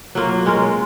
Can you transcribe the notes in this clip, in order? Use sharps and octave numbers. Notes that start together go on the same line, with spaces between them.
F#3 A#3 F4
G#3 C#4 F4 A#4